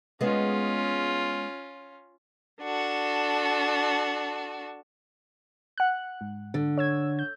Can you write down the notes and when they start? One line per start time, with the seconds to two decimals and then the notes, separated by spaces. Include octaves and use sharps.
0.21 G#3 B3 C#4 F4
2.61 D4 F#4 A4
5.78 F#5 F#6
6.21 G#2
6.54 D3
6.78 C#5 E6 G#6
7.19 G6